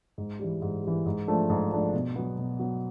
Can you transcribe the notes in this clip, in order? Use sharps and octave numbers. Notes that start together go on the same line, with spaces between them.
G#2
E3 G3
G#2
E3 G3
G#2
F3 A3 D4
G#2
F3 A3 D4
B2
F#3 B3
B2
F#3 B3